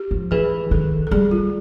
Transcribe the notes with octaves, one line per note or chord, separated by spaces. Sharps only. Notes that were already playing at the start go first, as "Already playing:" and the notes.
Already playing: G4
F3
E3 G#4
D#3 A4
A4
G3 G#4
F4